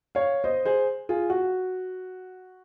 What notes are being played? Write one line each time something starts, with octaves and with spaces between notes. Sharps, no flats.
C#5 F5
C5 D#5
G#4 C5
F4 G#4
F#4